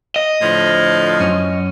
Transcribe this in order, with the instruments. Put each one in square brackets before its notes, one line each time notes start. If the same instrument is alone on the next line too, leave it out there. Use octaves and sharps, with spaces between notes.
[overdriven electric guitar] D#5
[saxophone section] A2 D3 F3
[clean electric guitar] F#2 C#4